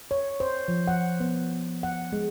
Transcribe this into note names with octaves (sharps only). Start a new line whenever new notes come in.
C#5
C5
F3
F#5
B3
F#5
G#3